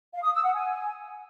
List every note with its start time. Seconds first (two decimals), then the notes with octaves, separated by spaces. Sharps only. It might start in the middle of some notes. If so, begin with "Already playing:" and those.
0.13 F5
0.23 D#6
0.33 E6
0.43 F#5
0.53 G#5